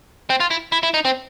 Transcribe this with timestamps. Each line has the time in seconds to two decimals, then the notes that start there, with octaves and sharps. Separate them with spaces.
0.30 C4
0.40 F4
0.51 E4
0.72 E4
0.83 E4
0.94 D#4
1.05 C4